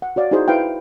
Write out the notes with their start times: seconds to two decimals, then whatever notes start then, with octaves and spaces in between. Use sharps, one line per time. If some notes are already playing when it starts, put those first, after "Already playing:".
0.02 F#5
0.16 F#4 C#5 D5 F5
0.31 D#4 E4 F#4 G#4 C5
0.48 E4 B4 C5 F5 G5